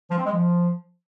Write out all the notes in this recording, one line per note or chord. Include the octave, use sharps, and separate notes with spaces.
F3
C4
G#3
F3